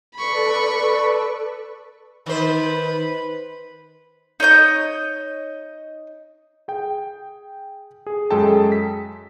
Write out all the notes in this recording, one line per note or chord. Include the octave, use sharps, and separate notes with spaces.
A4 B4 D5 B5 C#6
D#3 B4 C5
D#4 C#5 D#5 G6
G#4 G5
G#4
F#2 G#3 G#4 A4 G5 A5
B6